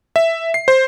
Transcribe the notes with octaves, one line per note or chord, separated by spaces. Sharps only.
E5
C7
C5